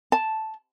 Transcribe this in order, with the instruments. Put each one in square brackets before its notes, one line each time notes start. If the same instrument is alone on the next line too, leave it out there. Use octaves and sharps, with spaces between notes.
[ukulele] A5